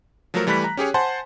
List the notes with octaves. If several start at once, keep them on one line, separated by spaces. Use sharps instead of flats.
F3 F#3 A3 A4 A#4
E3 G3 A3 B5 F#6 B6
A#5
C#4 G4 G#4 C#5
C5 F#5 G#5 A5 C6